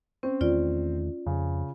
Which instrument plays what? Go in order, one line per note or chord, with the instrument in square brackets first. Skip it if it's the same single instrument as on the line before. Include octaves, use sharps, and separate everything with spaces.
[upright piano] C4 [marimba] C#4
[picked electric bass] E2 D#3 A3 [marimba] F4 D5
[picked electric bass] F2 [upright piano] C#3